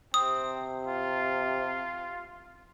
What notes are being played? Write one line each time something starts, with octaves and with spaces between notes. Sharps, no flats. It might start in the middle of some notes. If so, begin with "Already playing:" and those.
C3 C4 D#6
F4